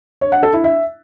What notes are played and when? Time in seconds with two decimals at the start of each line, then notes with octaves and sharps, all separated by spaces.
0.21 C#5
0.32 F#5
0.43 A4
0.53 E4
0.64 E5